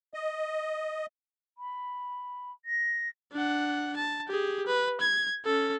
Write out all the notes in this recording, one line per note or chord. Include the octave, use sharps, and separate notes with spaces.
D#5
B5
A#6
D4 F#5
A5
G4 G#4
B4
G#6
C#4 A4